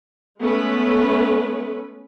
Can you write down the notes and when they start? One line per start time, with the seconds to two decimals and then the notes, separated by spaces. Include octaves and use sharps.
0.40 G#3 A3 B3 C#4 B4